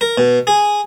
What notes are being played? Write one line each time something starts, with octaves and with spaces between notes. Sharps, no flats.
A#4
B2
G#4